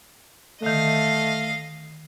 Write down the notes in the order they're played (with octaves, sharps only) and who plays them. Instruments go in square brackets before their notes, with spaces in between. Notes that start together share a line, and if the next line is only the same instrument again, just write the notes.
[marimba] D3 D#3 [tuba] A3 [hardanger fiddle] D#5 F5